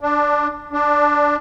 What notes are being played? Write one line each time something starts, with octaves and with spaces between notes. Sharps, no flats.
D4
D4